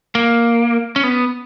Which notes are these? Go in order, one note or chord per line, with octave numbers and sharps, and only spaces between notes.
A#3
C#4
B3